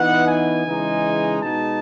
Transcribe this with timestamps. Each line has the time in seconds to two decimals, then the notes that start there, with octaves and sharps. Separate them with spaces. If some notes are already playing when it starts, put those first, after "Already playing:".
Already playing: E3 B3 D#4 F#5
0.27 G#5
0.65 C#3 E3 G#3 D#4
1.42 B2 G#3 D#4 A5